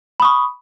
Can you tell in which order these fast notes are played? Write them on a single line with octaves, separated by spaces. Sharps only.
B5 D#6 C#6